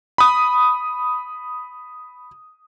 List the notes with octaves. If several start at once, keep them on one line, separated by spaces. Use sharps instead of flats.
B5 D#6